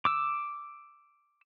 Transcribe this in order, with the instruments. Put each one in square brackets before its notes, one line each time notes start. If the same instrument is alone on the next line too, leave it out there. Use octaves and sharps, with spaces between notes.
[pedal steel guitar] D6 E6